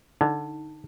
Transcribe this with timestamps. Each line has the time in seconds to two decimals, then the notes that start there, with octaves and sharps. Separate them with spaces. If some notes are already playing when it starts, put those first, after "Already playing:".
0.21 D3 D#4